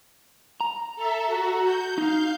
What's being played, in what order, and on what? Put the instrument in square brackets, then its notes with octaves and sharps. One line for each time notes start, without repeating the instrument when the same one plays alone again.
[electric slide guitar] A#5
[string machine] A4 E5
F#4
G6
[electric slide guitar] D#4 [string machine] F5 G6